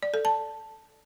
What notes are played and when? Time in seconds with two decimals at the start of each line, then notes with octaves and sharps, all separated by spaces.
0.03 D5
0.14 A4
0.25 A5